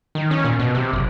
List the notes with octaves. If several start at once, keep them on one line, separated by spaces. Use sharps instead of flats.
D#3
C#4
A#2
B2
C3
F#1